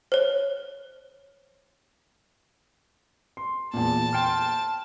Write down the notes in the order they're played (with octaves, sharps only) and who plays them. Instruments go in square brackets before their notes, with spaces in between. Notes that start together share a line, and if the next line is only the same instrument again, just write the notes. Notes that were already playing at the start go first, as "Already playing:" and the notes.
[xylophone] C5 C#5
[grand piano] C6
[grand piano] E2 A#2 [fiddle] A5
[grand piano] G5 C6 F6